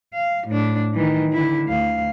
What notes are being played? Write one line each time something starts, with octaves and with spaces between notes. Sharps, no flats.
F5
A2 D4
D#3 E3
D3 E4
D2 F5